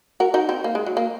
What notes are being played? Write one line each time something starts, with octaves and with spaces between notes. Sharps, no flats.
F#4 A#4
D#4 F#4
C4 D#4
A#3
G#3
F#3
A#3